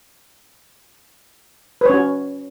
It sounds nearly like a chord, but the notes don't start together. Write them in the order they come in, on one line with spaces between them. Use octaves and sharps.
B4 C#5 C#4 F#4